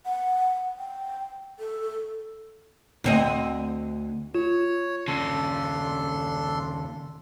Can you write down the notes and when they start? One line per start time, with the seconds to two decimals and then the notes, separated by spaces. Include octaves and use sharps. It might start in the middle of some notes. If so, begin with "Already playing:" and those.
0.06 F#5
0.79 G5
1.59 A4
3.04 D2 C4 D#5
4.35 F4 C#5
5.08 D#2 C#3 D4 A4 C6